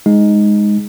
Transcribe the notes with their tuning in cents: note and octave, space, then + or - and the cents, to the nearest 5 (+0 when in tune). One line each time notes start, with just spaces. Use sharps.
G#3 +0 D#4 +0